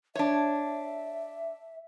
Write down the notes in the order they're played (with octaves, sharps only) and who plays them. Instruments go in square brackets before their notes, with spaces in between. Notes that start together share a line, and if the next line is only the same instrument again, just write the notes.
[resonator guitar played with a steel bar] D4 C#5 [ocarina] E5